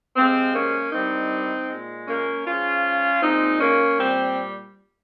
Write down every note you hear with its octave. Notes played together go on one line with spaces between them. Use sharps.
C3 F3 G#3 C4
A#3 C#4
G2 D#3 G3 C4 D#4
A#2 G#3
A#3 C#4
G#2 F3 G#3 C#4 F4
A#2 G#3 C4 D#4
A#3 C#4
A#2 G3 C4